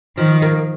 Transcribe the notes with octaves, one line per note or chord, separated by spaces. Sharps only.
D#3 F3
A#3